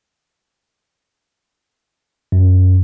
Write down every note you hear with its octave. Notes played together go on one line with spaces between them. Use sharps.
F#2